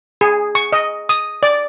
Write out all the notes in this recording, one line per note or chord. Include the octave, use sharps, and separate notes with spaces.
G#4
C#6
D#5
D#6
D5